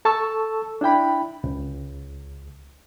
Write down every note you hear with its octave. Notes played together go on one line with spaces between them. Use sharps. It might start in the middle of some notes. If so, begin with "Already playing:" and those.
A4 A5 C#6 E6
D4 E4 G5 B5
C#2